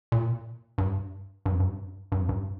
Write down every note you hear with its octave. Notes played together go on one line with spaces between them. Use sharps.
A#2
G2
G2
F2
G2
G2
F2
G2